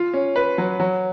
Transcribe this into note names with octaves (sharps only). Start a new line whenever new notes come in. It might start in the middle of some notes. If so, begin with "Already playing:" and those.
Already playing: F4
C#4
B4
F#3
F#3